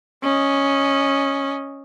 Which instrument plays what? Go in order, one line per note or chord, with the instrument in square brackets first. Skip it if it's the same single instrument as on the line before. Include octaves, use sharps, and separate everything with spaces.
[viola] C#4 D#5